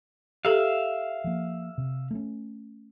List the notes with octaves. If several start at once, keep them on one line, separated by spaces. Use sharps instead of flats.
G4 A4 E5 F5
F3 A#3
C3
A3 A#3 C#4